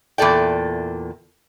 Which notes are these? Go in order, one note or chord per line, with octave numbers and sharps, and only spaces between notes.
E2 A#2 A4 D5 G5